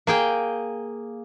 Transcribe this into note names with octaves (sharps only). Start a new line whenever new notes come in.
A#3 G#4 G5